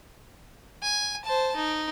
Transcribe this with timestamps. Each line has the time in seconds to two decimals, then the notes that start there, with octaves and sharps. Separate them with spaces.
0.83 G#5
1.25 C5 A5
1.56 D#4